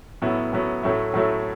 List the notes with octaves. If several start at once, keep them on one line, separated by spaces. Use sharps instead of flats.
A2 F#3 B3 E4
A2 F#3 B3 E4
A2 F#3 A3 E4
A2 F#3 A3 E4